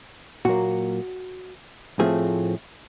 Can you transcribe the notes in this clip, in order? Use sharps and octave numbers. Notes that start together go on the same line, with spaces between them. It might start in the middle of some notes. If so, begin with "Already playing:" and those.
A#2 F#3 A#3 F#4
A2 F3 A3 C4 G#4